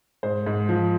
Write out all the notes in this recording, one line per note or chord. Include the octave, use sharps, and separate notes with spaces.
G#2 C5
G#2
F3